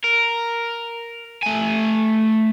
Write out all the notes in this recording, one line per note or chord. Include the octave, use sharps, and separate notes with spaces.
A#4
A3 G#5